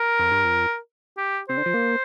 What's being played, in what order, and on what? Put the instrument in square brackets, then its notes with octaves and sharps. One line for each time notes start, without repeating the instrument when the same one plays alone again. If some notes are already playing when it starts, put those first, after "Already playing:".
Already playing: [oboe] A#4
[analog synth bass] F2
G2
F2
[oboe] G4
[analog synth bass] C3 [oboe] C5
[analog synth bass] D3
F3
A#3